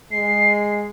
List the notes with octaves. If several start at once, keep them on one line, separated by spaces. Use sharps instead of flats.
G#3 C7